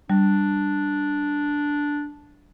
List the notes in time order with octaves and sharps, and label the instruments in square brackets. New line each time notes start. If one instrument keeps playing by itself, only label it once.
[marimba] G3 [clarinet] D4